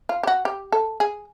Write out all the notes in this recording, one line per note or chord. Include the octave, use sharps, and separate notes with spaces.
F4
G4
F#4
G4
A4
G#4